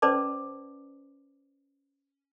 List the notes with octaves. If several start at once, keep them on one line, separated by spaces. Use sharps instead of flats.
C#4 B4 C5 D5 A5 D6